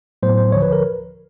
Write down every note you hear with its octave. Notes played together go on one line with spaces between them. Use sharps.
A2 F#3 B3 C5
C5
D2 D3 F3 C#5
B4
A#4